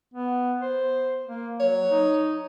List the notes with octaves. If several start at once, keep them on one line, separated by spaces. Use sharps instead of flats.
B3
C5
A#3
F#3 C#5
D#4